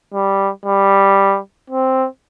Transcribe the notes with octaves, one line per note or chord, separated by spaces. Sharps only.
G3
G3
C4